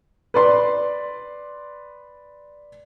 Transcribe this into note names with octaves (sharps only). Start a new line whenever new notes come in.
B4 D5 C6